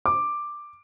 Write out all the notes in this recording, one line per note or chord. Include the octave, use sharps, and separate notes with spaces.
D6